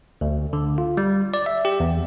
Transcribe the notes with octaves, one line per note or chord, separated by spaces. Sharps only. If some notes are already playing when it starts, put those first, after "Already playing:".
D2
D3
F4
G3
D5
E5
G4
E2